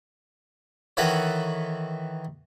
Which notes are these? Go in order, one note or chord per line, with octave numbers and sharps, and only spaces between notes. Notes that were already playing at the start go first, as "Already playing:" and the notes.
D#3 E3 F#4 A4 B4 C#5